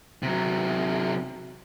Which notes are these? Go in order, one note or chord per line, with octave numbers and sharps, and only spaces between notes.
C3 F#3